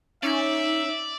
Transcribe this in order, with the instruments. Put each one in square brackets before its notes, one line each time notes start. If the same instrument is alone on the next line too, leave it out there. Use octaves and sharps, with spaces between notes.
[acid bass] C#4 [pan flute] D#4 [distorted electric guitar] D5 [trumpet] E5